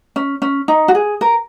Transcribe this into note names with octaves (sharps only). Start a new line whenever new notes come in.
C#4
C#4
D#4
F#4
G#4
A#4